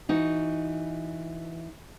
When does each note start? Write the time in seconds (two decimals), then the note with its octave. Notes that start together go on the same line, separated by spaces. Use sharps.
0.09 E3 D#4 F#4